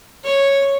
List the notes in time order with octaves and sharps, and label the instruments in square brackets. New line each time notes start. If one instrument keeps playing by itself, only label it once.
[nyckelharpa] C#5